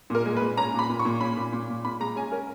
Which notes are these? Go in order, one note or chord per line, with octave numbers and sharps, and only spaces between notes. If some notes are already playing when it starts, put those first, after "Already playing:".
A#2 A#4
G#3
B4
A#2
C#4 A#5
A#2 B5
A#2
C#6
A#2
C#4 B5
A#2
A#2
A#2
A#2 B5
G#3 A#5
C#4 G#5
C#4 A#4